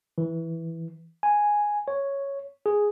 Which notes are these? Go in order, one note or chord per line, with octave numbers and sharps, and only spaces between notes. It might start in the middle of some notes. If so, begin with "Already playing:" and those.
E3
G#5
C#5
G#4